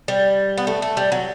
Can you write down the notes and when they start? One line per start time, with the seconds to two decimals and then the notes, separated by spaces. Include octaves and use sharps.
0.08 G3
0.58 B3
0.67 A3
0.82 A3
0.97 G3
1.12 F#3